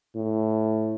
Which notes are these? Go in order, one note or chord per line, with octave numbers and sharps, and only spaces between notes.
A2